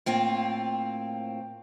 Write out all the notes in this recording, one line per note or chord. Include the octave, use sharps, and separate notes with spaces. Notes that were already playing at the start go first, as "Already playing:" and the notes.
A2 A#3 C4 F4